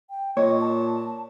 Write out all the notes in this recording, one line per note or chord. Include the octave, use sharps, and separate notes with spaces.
G5
A#2 C#5 D#5
A5